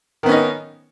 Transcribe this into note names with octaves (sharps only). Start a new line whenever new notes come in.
D#3 B3 C#4 D#4